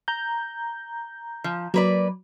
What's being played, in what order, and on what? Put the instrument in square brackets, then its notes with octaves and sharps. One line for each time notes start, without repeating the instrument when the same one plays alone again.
[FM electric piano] A#5 G6
[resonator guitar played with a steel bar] F3
[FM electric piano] F#3 [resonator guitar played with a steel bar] A#3 B4 D5